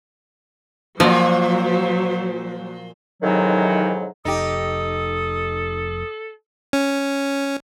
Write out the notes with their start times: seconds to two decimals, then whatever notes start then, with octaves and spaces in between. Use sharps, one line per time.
1.00 F#2 A#2 F3 F#3 A#3 C5
3.22 F2 G#2 C3 D#3 E3 F#3
4.25 F1 D#4 G4 A4 D#6
6.73 C#4